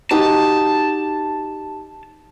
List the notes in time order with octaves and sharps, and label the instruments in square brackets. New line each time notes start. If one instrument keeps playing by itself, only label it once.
[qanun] D#4 F#4 G4 [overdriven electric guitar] A5